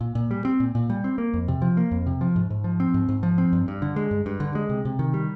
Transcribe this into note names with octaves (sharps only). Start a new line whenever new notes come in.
A#2
A#2
G3
C4
A#2
A#2
G3
C4
A#3
F2
C3
F3
A#3
F2
C3
F3
G#2
G#2
F3
C4
G#2
G#2
F3
C4
G2
G2
D3
G#3
G2
G2
D3
G#3
C3
C3
D#3
G3